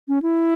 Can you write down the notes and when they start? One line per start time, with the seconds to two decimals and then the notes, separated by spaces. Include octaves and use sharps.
0.08 C#4
0.23 E4